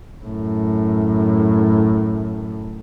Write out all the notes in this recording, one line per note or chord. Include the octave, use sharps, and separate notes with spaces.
F#2 A2